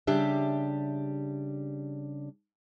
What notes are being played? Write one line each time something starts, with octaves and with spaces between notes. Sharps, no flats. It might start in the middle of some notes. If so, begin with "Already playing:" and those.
C#3 G3 D4 G4 E5